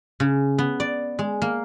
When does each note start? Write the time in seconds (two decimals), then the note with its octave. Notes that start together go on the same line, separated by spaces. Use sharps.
0.20 C#3
0.58 B3
0.80 D5
1.19 G#3
1.42 A#3